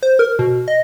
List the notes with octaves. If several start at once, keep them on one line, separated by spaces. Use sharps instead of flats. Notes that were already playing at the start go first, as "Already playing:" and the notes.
C5
A#4
B2
D#5